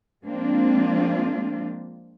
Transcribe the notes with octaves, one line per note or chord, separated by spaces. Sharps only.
F3 G#3 A#3 C4 D4 F4